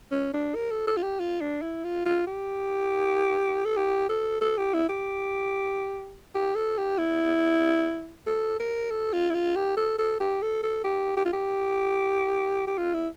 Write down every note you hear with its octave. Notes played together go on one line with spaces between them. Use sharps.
C#4
D4
A#4
A4
A4
F4
G4
F4
D4
E4
F4
F4
G4
A4
G4
A4
A4
G4
E4
G4
G4
A4
G4
E4
A4
A#4
A4
F4
E4
F4
G4
A4
A4
G4
A4
A4
G4
G4
F4
G4
G4
F4
E4